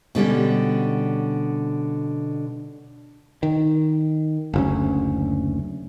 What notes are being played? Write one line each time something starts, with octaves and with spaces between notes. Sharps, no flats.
B2 D3 G3 C#4
D#3
F#1 D2 C#4